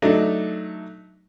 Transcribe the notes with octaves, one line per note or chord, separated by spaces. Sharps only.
F#3 A3 D4 D#4